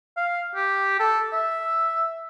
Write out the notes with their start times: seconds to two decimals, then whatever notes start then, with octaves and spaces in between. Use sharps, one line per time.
0.17 F5
0.55 G4
1.00 A4
1.33 E5